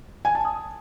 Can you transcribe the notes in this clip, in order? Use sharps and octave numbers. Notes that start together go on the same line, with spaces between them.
G#5
A5
D#6